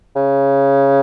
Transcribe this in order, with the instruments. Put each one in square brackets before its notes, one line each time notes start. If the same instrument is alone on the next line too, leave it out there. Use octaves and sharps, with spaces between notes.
[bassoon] C#3